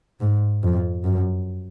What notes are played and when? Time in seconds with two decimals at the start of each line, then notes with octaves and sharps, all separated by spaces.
0.20 G#2
0.63 F2
1.04 F#2